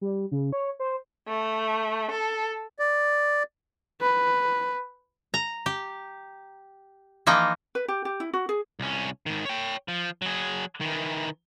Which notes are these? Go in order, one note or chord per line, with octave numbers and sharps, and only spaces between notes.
G3
C#3
C#5
C5
A3
A4
D5
B4
A#5
G4
E3 F3 A#3 D#4
B4
G4
G4
E4
F#4
G#4
C2 C#4
G#2 D#3
C#5 G5
F3
F#3 G#4
D#3 E3